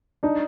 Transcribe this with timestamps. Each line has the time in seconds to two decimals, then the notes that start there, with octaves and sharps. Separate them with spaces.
0.23 D4 D#4